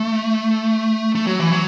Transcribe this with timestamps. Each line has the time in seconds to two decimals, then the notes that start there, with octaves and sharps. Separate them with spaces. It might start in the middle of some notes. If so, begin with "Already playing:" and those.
Already playing: A3
1.15 A3
1.27 F#3
1.39 E3
1.51 F#3